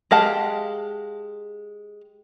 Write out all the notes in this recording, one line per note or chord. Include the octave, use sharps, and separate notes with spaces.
G#3 G4 F5 F#5 A5